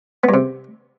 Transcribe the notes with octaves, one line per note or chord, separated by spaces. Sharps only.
B3
G2
C3